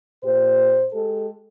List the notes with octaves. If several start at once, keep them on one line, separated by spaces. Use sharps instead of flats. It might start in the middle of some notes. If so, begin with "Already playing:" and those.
A#2 G4 C5
G#3 G4 A4